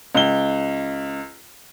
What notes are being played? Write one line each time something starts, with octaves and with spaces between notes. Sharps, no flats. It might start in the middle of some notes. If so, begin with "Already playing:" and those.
C#2 G7